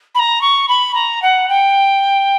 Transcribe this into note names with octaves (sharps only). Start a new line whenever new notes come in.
B5
A#5
C#6
B5
A#5
F#5
G5